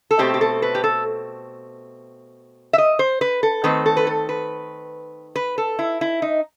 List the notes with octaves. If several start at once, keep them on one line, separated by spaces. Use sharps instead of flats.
A4
B2 A3 C4 G4
G4
A4
B4
G4
A4
E5
D#5
C5
B4
A4
D#3 A3 C4 B4
A4
B4
A4
B4
B4
A4
E4
E4
D#4